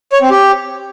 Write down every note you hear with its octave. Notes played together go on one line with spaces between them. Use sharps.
C#5
C4
G4